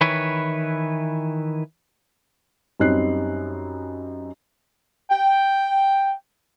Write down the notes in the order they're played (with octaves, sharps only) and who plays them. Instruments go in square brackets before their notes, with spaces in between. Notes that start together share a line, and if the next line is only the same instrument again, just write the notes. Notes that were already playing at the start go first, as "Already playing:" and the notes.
[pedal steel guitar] D#3 E3 E4 B4 C#5
[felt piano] F#2 G3 C4 D#4 F#6 C7
[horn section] G5